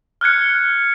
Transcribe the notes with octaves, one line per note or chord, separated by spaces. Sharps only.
F6 F#6 G#6 C#7